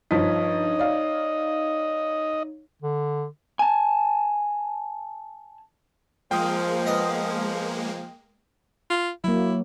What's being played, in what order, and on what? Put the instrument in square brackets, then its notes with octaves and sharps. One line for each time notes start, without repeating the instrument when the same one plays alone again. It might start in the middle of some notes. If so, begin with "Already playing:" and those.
[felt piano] G2 F3 B6 [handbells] D#4 C#5 [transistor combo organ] D#5
[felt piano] D5 F5
[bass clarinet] D3
[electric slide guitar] G#5 A5
[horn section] F3 [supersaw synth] G#3 A#3 [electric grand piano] G5 D#6
[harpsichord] B3 D#5
[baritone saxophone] F4
[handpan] F#3 A#3 [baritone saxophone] E4